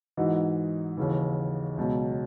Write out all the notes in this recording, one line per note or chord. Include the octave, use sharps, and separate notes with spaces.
G#2 E3 D#4 F#4
D#2 C#3 E3
C#2 B2 F#3